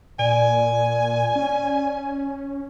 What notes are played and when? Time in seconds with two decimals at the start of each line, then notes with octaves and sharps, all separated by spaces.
0.19 A#2 D5 G#5
1.35 C#4